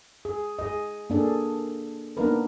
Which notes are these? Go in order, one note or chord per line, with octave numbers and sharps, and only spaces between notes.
G#4
G#4 D#5
A#3 D4 G#4 A4
A#3 B3 D4 D#4 A#4 B4